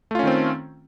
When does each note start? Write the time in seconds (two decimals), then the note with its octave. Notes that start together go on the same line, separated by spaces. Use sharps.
0.11 A3
0.15 F4
0.19 C#4
0.23 D#3
0.27 C4